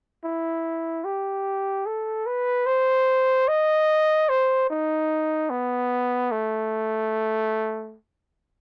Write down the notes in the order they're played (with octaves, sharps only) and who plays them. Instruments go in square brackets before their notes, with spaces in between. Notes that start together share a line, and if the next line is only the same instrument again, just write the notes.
[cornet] E4
G4
A4
B4
C5
D#5
C5
D#4
B3
A3